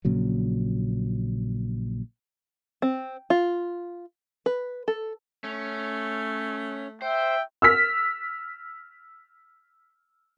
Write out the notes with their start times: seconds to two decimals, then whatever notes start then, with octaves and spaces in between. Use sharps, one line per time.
0.05 A#1 A#2 C#3 F#3
2.82 C4
3.30 F4
4.46 B4
4.88 A4
5.44 A3 C#4
7.02 C5 E5 G5
7.62 E6 F6 B6